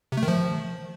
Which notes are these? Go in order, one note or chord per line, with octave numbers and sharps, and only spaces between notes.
C3
A3
D#3
F3